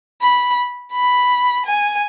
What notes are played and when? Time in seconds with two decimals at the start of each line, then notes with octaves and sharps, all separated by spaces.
0.21 B5
0.93 B5
1.66 G#5